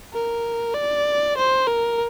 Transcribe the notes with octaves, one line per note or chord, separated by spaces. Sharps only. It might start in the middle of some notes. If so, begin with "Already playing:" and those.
A#4
D5
C5
A#4